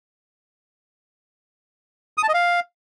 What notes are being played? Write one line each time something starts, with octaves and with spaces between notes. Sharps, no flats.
D#6
A5
D#5
F5